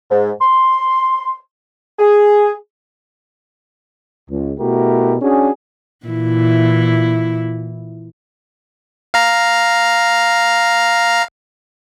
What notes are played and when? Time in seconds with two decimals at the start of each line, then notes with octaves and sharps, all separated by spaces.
0.11 G#2
0.41 C6
1.98 G#4
4.30 C#2
4.60 B2 A3 E4 F#4 G4 A#4
5.22 C#4 D4 F#4 G#4
6.06 A#2 E3 E4
9.14 F5 A#5